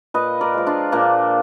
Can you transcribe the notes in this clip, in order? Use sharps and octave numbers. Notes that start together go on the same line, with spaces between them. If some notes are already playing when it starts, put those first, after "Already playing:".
A#2 B4 D#5
A#4 D5
F3 G#3
D4 F4
A#2 A#3 D4